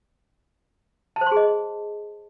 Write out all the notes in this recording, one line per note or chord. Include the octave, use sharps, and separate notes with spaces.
A5
C5
C6
G#4
D#5